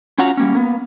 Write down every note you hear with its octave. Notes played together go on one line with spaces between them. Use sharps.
C#4 F4 F#4 F#5 A#5
G3 A#3 C#4
A#3 B3